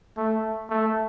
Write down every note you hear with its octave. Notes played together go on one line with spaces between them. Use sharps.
A3
A3